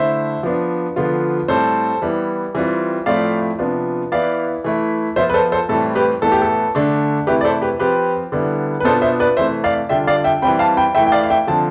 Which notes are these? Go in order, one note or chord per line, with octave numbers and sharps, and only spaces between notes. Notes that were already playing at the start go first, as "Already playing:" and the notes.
Already playing: D3 A3 E4 C5 E5
F3 B3 D4
D3 F3 B3 F4
A2 G3 C4 A4 C5
E3 G3 B3 E4
E3 G3 C4 F4
A2 F3 A3 C4 E4 D5 F5
C3 F3 B3 D4 F4
E3 B3 E4 D5 F5
E3 A3 E4
F3 B3 F4 C5 E5
B4
A4 C5
A4 C5
A2 E3 G3 C4 A4
G4 B4
A2 E3 B3 A4
G4
A4
D3 A3 D4
C3 E3 A3 E4 G4 B4
D5
A4 C5
G4 B4
F3 C4 F4 G4 B4
D3 G3 B3 E4
B4
B2 B3 D4 F4 A4 C5
C5 E5
B4 D5
C3 E3 A3 C5 E5
D5 F5
D3 G3 D4 F4 E5 G5
D5 F5
E5 G5
E3 G3 C4 G5 B5
F5 A5
G5 B5
E3 A3 E4 E5 G5
G5
D5 F5
F5
E5 G5
D3 F3 C4 A5